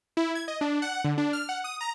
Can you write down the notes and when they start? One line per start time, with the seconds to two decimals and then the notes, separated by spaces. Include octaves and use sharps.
0.17 E4
0.35 G#6
0.48 D#5
0.61 D4
0.82 F#5
1.04 D3
1.18 D4
1.33 F6
1.49 F#5
1.64 D#6
1.81 A#5